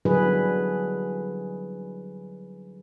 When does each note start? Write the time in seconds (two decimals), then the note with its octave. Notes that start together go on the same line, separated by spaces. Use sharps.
0.05 D3 F#3 G3 E4 G#4 B4